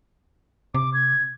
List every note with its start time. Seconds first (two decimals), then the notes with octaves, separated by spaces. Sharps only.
0.74 C3 D6
0.94 G#6